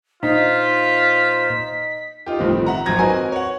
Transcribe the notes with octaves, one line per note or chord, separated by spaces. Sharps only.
A#2 D#4 F4 C5 B6
D#4 F4 G4
G1 A2 D#3 F3 C4
E5 F#5 A#5
G#1 F#2 F#3 A#5 G#6 A#6
C4 D#4 F#4 A#4 B4 G#5
C#5 F#5